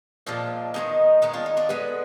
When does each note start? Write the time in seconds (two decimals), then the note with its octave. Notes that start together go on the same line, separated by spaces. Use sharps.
0.27 A#2 F3 G#3 D4 F4
0.74 D#3 G#3 B3 D#4
1.22 D#3 G#3 B3 D#4
1.33 D4 F4
1.46 D#4
1.57 D4 F4
1.69 D3 G#3 B3 G#4 B4